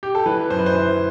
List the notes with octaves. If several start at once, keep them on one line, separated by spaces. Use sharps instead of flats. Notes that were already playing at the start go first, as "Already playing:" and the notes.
G4
A4
E3 B4
F#2 C5
B4
C5
E3